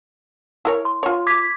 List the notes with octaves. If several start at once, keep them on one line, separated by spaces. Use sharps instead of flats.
E4 A#4 C#5
C6
F4 C#5
D6 G#6 B6